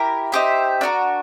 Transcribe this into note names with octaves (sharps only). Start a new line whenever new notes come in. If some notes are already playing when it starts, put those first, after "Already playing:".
Already playing: E4 G4 A#4
D#4 G4 C5 E5
D4 F#4 A#4